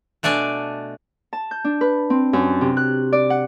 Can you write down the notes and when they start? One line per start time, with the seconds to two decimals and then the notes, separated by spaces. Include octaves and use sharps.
0.23 B2 A3 D4 D5 G#5
1.33 A5
1.51 G6
1.65 D4
1.81 B4
2.10 C4
2.33 F#2
2.61 C3
2.77 F#6
3.13 D5
3.30 F#5